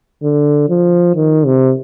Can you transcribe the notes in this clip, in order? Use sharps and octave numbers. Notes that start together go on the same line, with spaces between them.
D3
F3
D#3
C3